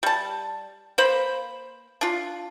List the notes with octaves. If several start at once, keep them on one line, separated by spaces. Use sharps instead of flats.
G3 A5
A#3 C5 B5
D4 F4